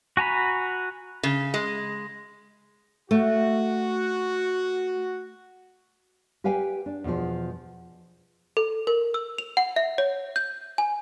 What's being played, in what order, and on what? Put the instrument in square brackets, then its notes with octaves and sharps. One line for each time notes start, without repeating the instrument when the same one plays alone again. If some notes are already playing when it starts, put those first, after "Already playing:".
[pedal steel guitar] F#4 G#5 A#5 B5
[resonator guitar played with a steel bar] C#3
G#3
[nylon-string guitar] A3 [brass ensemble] F#4
[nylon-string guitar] G4 B4 F5 G5 G#5
D4
E2 B2 D3 F3
[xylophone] A4
A#4
E6
F7
F#5
E5
C#5
G6
G#5